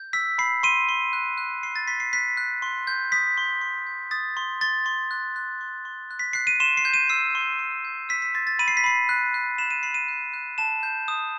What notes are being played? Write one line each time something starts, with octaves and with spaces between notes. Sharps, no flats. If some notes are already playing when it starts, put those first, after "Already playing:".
Already playing: G6
E6 B6
B5 C7
C6 D#7
C6
F#6
F#6
C6 C7
A6
C6 B6
C7
F#6 B6
F#6
C6
G6
D#6 B6
C6
C6
G6
D#6 A6
C6
C6 A6
C6
F#6
F#6
C6
C6
F#6
B6
F#6 C7
D#7
C6 E7
C7
G6
D#7
E6 C7
C6
C6
G6
E6 B6
B6
C6 A6
A6
B5 D#7
C7
B6
B5 C7
F#6
F#6
B5 E7
D#7
B5 C7
D#7
F#6
F#6
A5 E7
G6
D#6